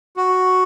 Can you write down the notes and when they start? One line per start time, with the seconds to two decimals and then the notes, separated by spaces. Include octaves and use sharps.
0.17 F#4